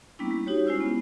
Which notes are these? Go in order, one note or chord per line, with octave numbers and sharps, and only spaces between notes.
G3 A#3 B3 C#4 D4 E4
G3
D#4 F#4 G4 C#5
G#3 C#4 E4 F4 C5 E6
B3